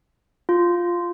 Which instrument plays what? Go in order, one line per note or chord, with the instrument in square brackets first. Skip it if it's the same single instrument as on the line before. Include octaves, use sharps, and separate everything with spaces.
[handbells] F4